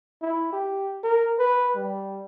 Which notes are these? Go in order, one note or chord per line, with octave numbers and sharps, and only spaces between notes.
E4
G4
A#4
B4
G3